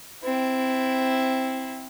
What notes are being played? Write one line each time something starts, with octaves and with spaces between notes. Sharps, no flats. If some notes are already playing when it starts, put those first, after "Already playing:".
C4 E4